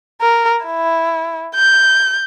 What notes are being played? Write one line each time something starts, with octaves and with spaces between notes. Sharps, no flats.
A#4
E4
G6